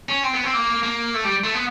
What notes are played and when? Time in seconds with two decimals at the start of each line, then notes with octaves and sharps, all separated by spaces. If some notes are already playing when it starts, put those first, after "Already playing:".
0.09 C#4
0.23 C4
0.33 B3
0.43 C4
0.53 A#3
0.83 A#3
1.14 A3
1.24 G3
1.44 A3
1.54 B3